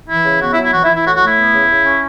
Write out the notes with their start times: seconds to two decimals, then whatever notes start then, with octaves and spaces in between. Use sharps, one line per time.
0.09 E3 E4
0.24 C#3
0.40 B3 F#4
0.51 E4
0.57 F#3
0.63 E4
0.73 E3 F#4
0.83 E4
0.89 E3
0.94 E4
1.05 A2 F#4
1.16 F#4
1.21 A3
1.27 E4
1.36 B3
1.53 C#3
1.69 C#3
1.85 C#4